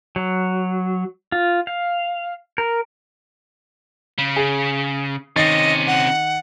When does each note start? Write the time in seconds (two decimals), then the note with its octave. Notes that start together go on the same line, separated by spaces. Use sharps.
0.16 F#3
1.32 F4
1.67 F5
2.58 A#4
4.18 C#3
4.36 G#4
5.36 C3 D#3 C#4 D#5 A6 C7
5.87 F#5